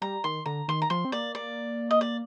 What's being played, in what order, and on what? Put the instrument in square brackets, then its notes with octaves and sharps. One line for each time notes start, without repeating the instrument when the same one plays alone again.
[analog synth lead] G3 [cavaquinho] A#5
[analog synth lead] D#3 [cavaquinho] C6
[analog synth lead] D3 [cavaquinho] A#5
[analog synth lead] D#3 [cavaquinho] C6
[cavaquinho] A#5
[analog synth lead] F3 [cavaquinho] C6
[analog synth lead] C4
[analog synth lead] A#3 [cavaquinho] D5
[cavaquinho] D5
D#5
D5